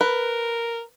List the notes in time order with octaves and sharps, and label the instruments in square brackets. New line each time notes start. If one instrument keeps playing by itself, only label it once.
[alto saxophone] A#4 [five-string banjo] B4